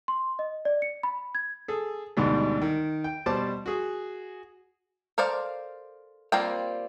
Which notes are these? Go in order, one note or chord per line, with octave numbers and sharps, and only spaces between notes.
C6
D#5
D5
C#7
B5
G#6
G#4 A4
D2 G#2 B2 G3
D#3
G5
B2 G3 C5 A5 D6
F#4 G#4
A4 A#4 C5 D5 F5
G3 A#3 C4 F4 G5